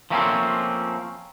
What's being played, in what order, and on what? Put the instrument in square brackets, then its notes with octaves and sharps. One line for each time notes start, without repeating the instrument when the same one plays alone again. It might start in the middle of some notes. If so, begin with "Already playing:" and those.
[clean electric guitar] F3 A3 A#3 C4 C#4